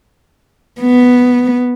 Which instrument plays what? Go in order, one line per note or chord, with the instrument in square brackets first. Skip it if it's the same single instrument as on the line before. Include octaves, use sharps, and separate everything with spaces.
[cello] B3